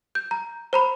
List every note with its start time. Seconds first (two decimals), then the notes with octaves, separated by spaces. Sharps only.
0.15 G6
0.31 A#5
0.73 C5 A#5 B5